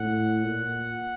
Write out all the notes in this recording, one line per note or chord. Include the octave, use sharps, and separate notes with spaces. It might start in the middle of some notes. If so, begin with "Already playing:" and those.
Already playing: A2 F#5
A#2